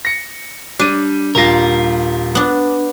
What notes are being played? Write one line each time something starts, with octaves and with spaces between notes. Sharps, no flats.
A#6 C#7
G3 D4 D#7
D#1 G3 F4 A#4 A#6
B3 D4